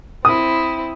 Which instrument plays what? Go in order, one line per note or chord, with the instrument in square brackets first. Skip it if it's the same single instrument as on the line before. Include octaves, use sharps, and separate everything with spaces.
[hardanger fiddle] C4 E4 [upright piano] D#6